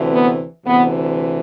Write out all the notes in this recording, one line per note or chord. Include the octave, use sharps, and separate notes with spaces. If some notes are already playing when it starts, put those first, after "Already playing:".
Already playing: D2 C3 E3
B3
D2 C3 E3 B3